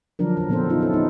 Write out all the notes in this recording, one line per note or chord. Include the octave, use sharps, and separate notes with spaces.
D3 F3 F#3 D4 A#4
E3 A#4
A#2 F3 B3 C4 A4 C5
B3 C#4 D#4 F4
E4 A4
G3 B3 D#4